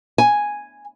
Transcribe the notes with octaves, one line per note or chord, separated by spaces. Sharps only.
G#5